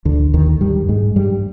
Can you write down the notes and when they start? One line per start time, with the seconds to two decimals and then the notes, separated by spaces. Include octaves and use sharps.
0.05 D2 D3
0.34 D#2 D#3
0.61 G2 G3
0.89 G#2 G#3
1.16 G2 G3